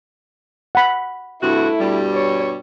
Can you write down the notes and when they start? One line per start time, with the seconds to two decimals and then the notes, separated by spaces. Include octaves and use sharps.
0.75 F#5 B5
1.42 G2 C3 A3 E4 F#4
1.80 G2 B2 G3
2.13 C#5